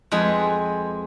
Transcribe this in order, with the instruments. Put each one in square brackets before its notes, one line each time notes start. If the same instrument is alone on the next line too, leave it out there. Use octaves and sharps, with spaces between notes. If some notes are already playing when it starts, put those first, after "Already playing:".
[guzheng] F2 G#3 B4 G#5